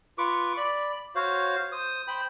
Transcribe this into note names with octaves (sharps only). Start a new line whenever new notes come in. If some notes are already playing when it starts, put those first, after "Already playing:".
F4 B4 C#6 D6
D5 B5
F#4 C5 C#5 F5
C5 D#6
C5 G5 B5